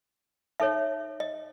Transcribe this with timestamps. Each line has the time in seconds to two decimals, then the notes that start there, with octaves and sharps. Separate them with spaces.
0.60 D#4 A4 C#5 E5
1.20 D#5